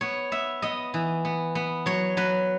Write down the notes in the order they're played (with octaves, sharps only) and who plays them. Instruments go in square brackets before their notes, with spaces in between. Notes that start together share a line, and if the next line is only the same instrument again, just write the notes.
[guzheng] B3 C#5
B3 E5
B3 D#5
E3
B3
B3
F#3 C#5
F#3 B4